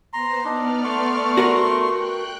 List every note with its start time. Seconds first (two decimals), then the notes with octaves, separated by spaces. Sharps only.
0.13 B3 C5 A#5 C6
0.44 B3 D4 D#4 D5 F6
0.84 A3 C6 C#6
1.37 F#4 A#4 B4
1.81 G5 F#6